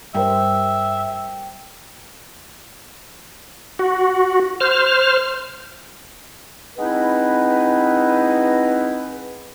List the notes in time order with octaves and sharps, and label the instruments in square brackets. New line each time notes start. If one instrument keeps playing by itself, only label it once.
[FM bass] G2 [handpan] G3 A#4 C5 [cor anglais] E5 [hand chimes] G5
[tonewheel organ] F#4
C5 F6
[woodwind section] G#3 B3 C4 D#4 E4 B4